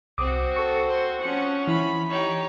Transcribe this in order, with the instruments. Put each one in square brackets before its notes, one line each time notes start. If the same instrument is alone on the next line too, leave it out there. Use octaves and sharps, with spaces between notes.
[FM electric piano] C2 D6 D#6 [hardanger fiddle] C4 F#4
[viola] A4 [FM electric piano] C#6 C#7
[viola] C5
[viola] F3 C#4 [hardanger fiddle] F#5
[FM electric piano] E3 E4 [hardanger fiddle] B5
[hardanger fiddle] D#4 G4 [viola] C#5